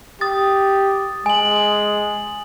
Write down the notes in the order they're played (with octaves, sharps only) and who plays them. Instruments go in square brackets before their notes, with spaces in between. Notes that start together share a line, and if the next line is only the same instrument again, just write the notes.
[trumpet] G4 [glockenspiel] D#6 A6
[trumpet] G#3 [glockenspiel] G#5 F#7